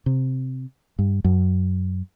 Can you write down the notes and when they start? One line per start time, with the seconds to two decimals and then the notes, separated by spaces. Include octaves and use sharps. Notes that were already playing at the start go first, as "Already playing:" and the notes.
0.06 C3
0.99 G2
1.24 F#2